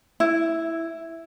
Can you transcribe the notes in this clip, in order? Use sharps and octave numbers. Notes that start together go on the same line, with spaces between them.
E4